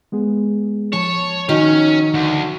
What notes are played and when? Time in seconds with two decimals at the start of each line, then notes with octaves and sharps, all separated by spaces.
0.12 G#3 B3 G#4
0.93 F3 C#5 A5
1.49 D#3 F#3 C#4
2.14 D2